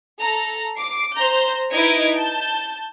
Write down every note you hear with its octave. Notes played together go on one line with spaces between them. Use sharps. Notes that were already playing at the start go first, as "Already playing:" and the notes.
A4 A#5
D6 C7 D7
C5 A#5 G6
D#4 E4 B4 D#5 G#6 D7
A5 G6